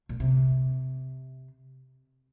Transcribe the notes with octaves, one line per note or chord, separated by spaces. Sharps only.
A#2
C3